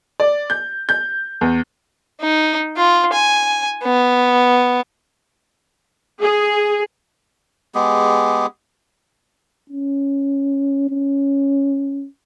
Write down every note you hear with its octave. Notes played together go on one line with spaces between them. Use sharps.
D5
G6
G6
E2
D#4
F4
G#5
B3
G#4
G#3 B3 G4 G#4
C#4
C#4